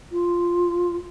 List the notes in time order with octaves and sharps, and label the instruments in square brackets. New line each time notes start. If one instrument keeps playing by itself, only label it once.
[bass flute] F4